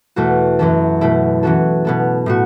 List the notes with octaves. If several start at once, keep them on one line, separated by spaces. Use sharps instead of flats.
E2 B2 A3 F#4 A4
F#2 E3 C#4 A4
B2 A3 E4 A4
E3 C#4 F#4 A4
B2 B3 A4
A2 A3 F#4